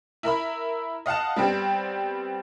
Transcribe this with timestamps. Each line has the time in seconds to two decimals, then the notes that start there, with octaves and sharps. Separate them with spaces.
0.23 E4 A#4 E5 B5
1.06 D#5 F5 F#5 A5
1.36 G3 B3 C4